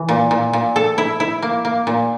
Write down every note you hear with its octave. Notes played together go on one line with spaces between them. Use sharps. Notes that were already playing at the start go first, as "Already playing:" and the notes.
Already playing: E3
A#2
A#2
A#2
A4
E4
E4
A#3
A#3
A#2